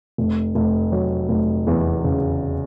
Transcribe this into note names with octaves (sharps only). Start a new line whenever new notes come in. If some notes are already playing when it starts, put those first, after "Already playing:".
F1
F1
F#3
F1
E2
C#3